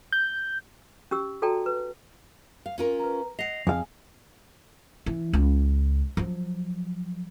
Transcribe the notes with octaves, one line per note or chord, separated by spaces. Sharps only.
G6
C#4 G4 E6
F#4 A4 D5 G5 A5 A#5
B4
F5
C#4 F4 A#4
B4 A#5
D#5 F#5 A#6 C7 F7
F2 G#4 F5 G#5
E3
C#2
F3 F#3